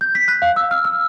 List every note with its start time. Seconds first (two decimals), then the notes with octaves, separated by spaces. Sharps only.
0.01 G6
0.15 B6
0.28 F#6
0.42 F5
0.56 E6
0.71 F6
0.85 E6